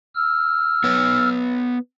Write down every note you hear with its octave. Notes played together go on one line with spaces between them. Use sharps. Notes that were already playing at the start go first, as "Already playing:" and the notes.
E6 F6
B3 B4 C#5